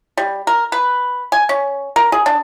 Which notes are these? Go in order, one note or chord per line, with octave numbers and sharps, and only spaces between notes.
G3
A#4
B4
G#5
C#4
A#4
G#4
D4